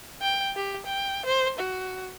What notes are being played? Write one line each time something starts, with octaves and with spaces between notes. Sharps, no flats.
G5
G4
G5
C5
F#4